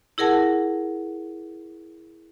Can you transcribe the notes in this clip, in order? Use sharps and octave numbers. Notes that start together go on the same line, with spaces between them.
E4 G#4 A#4 F#5 A5